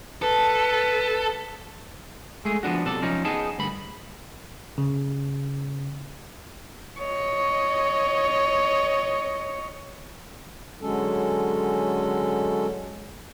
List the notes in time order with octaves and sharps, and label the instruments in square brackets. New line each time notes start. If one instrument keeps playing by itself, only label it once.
[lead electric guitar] A4 [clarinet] B4
[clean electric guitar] G#3 A3 G#4
F3 B3 D4 F#4
B1 C3 A4 D5
F3 C#4 D#4
B3 D#4 G#4 A5
D2 G2 B5
[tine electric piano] C#3
[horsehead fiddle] C#5 D#5
[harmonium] D3 F#3 G#3 C#4 A4